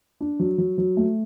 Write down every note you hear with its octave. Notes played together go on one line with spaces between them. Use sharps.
D4
F#3
F#3
F#3
A3